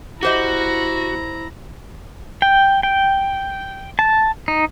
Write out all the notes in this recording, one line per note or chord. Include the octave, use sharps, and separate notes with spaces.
E4 F#4 G4 C5 D#5 A#5
G5
G5
A5
D#4